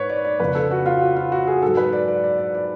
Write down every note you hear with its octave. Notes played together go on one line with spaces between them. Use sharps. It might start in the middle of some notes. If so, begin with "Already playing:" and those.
Already playing: G#2 B4 C#5
D5
D5
F2 C#3 F3 B4
A4
F#4
F4
F#4
F4
F#4
G#4
G#2 F#3 A4
B4
D5
D5
D5
D5
D5